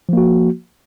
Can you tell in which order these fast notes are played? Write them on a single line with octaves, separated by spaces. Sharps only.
F3 A#3 F#4